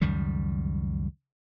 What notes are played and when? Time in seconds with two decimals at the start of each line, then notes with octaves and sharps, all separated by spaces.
0.01 C#2 F#2 D#3 G3